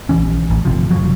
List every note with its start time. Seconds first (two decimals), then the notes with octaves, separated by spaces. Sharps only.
0.09 A#1 D#2 E3 C#4
0.50 A1
0.65 G1 C3 F3
0.91 F#1 F3 F#3